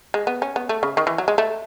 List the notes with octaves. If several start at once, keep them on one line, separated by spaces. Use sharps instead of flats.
G#3
B3
C#4
B3
A3
C#3
D#3
E3
F#3
G#3
A3